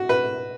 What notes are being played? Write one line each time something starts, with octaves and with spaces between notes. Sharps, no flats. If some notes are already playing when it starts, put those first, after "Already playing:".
Already playing: F#4
B4